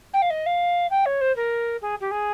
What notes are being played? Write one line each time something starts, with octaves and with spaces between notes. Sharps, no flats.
G5
F5
D#5
F5
G5
C#5
C5
A#4
G#4
G4
G#4